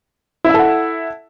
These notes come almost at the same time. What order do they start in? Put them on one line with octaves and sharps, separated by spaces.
E4 E5 A4 F#5